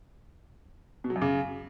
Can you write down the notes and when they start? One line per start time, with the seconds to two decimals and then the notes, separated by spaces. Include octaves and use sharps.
1.04 B2
1.10 F#3
1.16 F#2
1.22 C#3